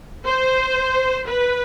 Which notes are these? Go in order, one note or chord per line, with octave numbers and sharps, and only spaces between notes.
C5
B4